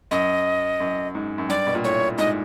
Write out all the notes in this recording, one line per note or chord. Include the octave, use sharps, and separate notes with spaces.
F#2 D#5
F#2
G#2
F#2
G2 D5
B2
A#2
A2 C#5
G#2 D#5